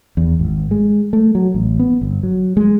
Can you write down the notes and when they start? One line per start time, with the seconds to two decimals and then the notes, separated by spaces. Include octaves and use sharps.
0.17 E2
0.39 G#1
0.71 G#3
1.13 A3
1.35 F#3
1.54 A1
1.79 B3
2.01 G1
2.23 F#3
2.57 G#3